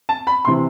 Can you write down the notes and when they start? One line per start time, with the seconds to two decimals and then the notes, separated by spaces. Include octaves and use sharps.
0.09 A5
0.27 B5
0.45 C3 E3 C6